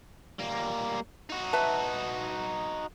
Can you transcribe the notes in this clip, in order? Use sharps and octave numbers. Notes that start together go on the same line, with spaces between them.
G3 A#3
D#4 F#4
B4 E5 A5